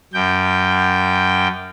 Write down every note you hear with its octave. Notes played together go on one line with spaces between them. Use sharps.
F#2 G5